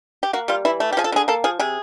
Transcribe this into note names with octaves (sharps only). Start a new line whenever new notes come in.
G4
A#3 F#4
G3 F4
E3 E4
A3
G4
F3 G#4
A4
D3 G#4
A#3 A4
F3 G#4
C3 G#4